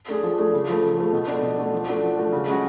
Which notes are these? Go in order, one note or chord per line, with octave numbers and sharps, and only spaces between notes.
A3 D4 G#4
F3
A3 D4 G#4
C#3
F3 A3
C#3
F3 A3
B2
A3 D4
B2
A3 D4
F3
A3 D4 F#4
F3
A3 D4 F#4
C#3
G#3 C#4 F#4